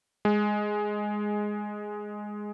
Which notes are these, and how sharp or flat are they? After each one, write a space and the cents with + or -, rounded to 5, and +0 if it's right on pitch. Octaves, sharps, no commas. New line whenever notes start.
G#3 +5